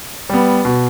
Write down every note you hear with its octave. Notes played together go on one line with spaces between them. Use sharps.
G3 B3
B2